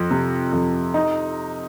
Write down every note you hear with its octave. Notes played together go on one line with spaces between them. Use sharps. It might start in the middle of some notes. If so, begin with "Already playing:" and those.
Already playing: F2 F3
C3
F2
D#4